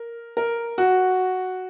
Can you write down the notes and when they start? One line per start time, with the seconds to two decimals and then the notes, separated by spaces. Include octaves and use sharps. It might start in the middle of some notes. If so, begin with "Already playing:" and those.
Already playing: A#4
0.37 A#4
0.78 F#4